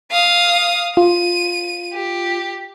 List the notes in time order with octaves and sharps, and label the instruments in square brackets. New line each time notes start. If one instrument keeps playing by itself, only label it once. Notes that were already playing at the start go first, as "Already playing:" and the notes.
[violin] F5 D#6
[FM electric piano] F4 [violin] D#7
[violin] G4